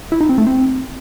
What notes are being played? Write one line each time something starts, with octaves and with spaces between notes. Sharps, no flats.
E4
D#4
C4
A3
C4